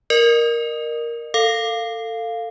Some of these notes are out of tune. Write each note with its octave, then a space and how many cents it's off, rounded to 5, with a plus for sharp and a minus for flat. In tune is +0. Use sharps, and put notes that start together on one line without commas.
A#4 +5 D#5 -40
A4 +25 F5 +0